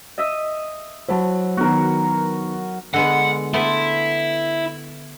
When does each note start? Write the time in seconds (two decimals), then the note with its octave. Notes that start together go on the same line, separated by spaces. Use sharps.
0.18 D#5 E5 E6
1.08 F#3 E4 C5 A5
1.57 D#3 B3 F#4 A#4
2.94 D3 G#3 B3 F#5
3.54 A3 B3 E4 C6